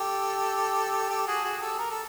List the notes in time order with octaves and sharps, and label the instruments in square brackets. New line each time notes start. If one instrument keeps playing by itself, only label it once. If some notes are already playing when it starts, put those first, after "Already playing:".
Already playing: [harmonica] G4 A4
G4 A4
F#4 G#4
F#4 G#4
G4 A4
A#4
A4